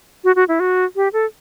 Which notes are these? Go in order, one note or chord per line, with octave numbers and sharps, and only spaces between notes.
F#4
F#4
E4
F#4
G4
A4